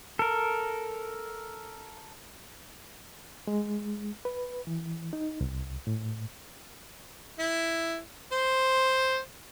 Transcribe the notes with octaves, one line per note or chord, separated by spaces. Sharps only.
A4 A#4
G#3
B4
E3
D#4
C2
A2
E4
C5